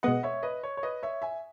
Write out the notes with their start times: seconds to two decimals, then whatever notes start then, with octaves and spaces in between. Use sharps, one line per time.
0.03 B2 G#3 B3 D#5 F#5
0.23 C#5 E5
0.43 B4 D#5
0.63 C#5
0.77 C#5
0.83 B4 D#5
1.03 C#5 E5
1.22 E5 G#5